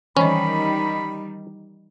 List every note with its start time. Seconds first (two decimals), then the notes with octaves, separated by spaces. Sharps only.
0.17 D#3 E3 G3 C#4 D5 B5